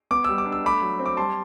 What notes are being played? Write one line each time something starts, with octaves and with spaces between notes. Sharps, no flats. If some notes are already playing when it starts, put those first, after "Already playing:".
B3 D6
G3 E6
D6
D4
E6
A3 B5 D6
F#3
C4
D6
G3 A5 C6